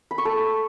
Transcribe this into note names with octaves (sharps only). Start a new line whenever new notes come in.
B5
C#6
A4